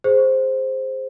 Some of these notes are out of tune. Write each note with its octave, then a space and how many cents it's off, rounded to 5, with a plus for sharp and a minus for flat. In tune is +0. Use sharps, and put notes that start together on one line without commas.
G#4 -5 C5 +0